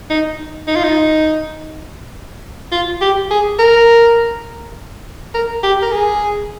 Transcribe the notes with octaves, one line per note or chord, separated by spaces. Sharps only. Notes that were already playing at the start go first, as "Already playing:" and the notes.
D#4
D#4
F4
D#4
F4
G4
G#4
A#4
A#4
G4
A#4
G#4